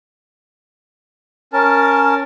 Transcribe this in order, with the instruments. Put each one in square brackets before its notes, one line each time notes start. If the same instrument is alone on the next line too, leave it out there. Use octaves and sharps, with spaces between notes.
[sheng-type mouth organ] C#4 A#4 A5